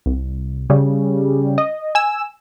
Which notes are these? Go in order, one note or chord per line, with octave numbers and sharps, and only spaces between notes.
C2
C#3 G3
D#5
G#5 E6